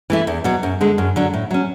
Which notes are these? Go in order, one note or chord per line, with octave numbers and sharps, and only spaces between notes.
E3 A3 E4
E2
B2 F#3
F#2
D3 G#3
F#2
D3 F#3
A2
F#3 C#4